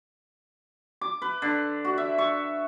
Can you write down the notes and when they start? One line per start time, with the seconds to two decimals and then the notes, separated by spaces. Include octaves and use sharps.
1.01 D6
1.22 B4
1.42 D3
1.85 F#4
1.98 E5
2.18 C#6